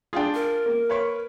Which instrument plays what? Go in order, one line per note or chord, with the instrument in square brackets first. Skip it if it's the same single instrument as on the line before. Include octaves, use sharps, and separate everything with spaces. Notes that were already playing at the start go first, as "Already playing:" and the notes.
[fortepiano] D4 G#4 [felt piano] F4 F5 G5
[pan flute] A#4
[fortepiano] A#3
[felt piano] B4 C#5 C#6